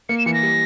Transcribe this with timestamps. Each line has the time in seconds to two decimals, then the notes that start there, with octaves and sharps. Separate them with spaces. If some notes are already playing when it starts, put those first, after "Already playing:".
0.09 A#3 C#7
0.18 E7
0.26 E3 C#7
0.34 A#6
0.43 G3